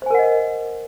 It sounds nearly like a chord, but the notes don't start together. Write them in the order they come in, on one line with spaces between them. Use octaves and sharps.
C5 G#5 A#4 F#5 D#5